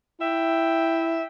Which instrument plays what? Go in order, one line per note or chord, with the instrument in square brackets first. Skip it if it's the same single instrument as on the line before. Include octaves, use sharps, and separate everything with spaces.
[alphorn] E4 [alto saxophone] E5 [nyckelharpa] G5